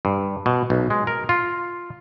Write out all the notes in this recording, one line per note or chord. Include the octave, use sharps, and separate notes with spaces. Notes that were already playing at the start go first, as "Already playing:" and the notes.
G2
B2
B1
G#3
A#4
F4